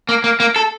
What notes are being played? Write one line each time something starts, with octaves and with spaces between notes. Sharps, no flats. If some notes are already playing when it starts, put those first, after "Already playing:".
A#3
A#3
A#3
A4